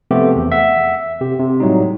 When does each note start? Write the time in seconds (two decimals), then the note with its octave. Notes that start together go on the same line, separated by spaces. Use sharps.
0.11 C3 F3 A3 B3 G4
0.36 E2
0.52 E5 F#5
1.21 C3 G4
1.39 C3
1.60 A2 F#3 G3 D#4